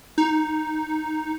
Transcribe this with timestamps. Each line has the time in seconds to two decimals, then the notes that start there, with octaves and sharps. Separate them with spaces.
0.18 D#4